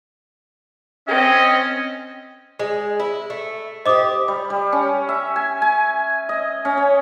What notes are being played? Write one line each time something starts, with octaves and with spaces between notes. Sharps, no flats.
C4 C#4 D#5
G#3
E4
A3
G4 C5 D#5 D6 D#6
G3
G3
C#4
E5
G#5
G#5
D#5
C#4
C#5